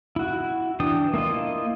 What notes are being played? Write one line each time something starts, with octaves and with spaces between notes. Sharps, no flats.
E4 F#4
E3 D4 G5 D#6
A#3 E4 F4 D#5